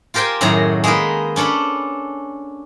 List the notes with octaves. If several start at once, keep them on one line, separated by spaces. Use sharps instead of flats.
F4 G4 A#4 C5 G5 G#5
F#2 A2 D#3 F#3 G#4 A#5
G#3 A#3 D#4 G#4 A#4 B4
C#4 D4 A4 C#5 B5